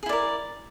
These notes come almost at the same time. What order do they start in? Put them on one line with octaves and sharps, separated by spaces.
G#4 E4 D5 A#4